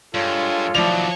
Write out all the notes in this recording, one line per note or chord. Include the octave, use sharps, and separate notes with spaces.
G2 G#3 F4 A4 C#5
D#2 F3 F#3 E4 D5 F7